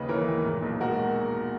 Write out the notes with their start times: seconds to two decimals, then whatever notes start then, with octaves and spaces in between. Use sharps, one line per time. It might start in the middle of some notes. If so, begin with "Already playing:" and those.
Already playing: D#2 C#3 B4 D#5
0.09 E3 A#4 C#5
0.26 D#2
0.45 A#2
0.62 B1
0.80 G#3 F#4 A#4